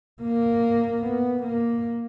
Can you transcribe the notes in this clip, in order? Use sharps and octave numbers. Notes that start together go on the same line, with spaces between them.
A#3
B3
A#3